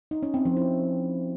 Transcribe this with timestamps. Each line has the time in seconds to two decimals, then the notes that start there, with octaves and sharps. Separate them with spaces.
0.11 D#4
0.23 C#4
0.34 C4
0.45 F3
0.57 E4